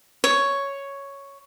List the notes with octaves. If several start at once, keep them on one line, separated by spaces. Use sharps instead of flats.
C#5